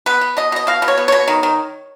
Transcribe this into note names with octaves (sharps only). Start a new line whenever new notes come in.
B3 B4
B3
B2 D#5
B2 D#5
B2 F5
B2
C#5
B3
B2 C#5
D#3
D#3